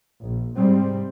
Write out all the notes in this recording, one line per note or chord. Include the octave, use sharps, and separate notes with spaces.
A#1
G#2 C3 G3 C4